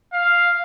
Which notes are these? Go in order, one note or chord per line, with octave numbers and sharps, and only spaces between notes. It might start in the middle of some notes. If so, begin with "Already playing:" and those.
F5